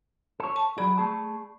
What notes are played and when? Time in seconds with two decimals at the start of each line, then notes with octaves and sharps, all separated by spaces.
0.40 A4 C#5
0.56 A5
0.78 F#3 G#4 D5 B5
0.98 A3 G#4 A5